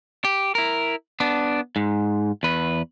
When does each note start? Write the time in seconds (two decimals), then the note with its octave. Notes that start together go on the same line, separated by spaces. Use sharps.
0.25 G4
0.55 E4 A#4
1.20 B3 D4
1.76 G#2
2.43 E2 B4